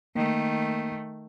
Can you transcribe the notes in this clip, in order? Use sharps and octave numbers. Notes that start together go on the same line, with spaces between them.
D#3 A3 A#3